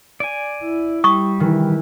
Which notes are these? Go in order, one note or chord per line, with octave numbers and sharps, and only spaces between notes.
D5 G#5
E4
G3 C#6 D#6
D#3 E3